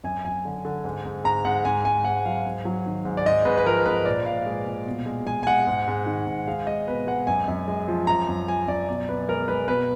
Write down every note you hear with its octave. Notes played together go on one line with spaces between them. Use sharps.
F#2 G#5
F#2 G#5
D3
D3
G#2
G#2
G#2 A#5
G#2 F#5
G#2 G#5
G#2 G#5
G#2 F#5
F#3 F5
G#2
F#3
D#3
G#2
D5
G#2 D#5
G#2 B4
B4
F3 A#4
G#2 B4
A#2 D5
A#2 F5
G#3
A#2
B2
G#3
G#3 G#5
G#5
G#3 F#5
G#2
G#2
D#3
G#2
G#3 F5
G#3 D#5
B2 B4
G#3 F#5
F#2 G#5
F#2
G#3
F3
F#2 A#5
F#2
F3 G#5
F#2 D5
B2 D5
B2 B4
G#3 A#4
G#3 B4
B2 B4